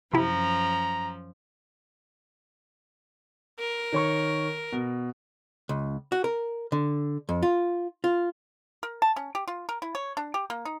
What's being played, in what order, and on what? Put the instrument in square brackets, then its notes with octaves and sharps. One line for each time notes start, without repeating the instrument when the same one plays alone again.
[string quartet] F#2 F3 [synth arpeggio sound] C3 E4 [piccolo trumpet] A#5
[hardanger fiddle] A#4
[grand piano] D#3 C#5 C#6
B2
[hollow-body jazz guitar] C#2
F#4
A#4
D3
F2
F4
F4
[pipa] A#4
A5
C#4
G4
F4
A#4
E4
C#5
D4
G4
A#3
D#4